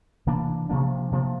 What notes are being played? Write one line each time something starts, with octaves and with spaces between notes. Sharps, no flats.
C3 E3 A#3 D4
C3 F3 A#3 D4
C3 F3 A#3 D4